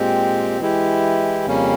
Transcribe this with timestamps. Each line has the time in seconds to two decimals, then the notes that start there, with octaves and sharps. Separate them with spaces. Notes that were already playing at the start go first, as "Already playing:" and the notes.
Already playing: A#2 G#3 C4 G4
0.61 E3 G#3 E4 G4
1.46 F2 C#3 G3 A#3 C#4